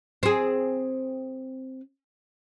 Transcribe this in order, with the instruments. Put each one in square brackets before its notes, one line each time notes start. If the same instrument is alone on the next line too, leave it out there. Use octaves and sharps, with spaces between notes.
[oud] C4 G#4